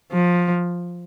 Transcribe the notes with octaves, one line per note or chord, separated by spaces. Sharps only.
F3